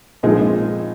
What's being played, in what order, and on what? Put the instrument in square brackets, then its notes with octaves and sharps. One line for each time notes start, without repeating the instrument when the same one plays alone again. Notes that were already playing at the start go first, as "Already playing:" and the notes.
[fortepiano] A#1 A#2 F3 G#3 C4 D#4 G#4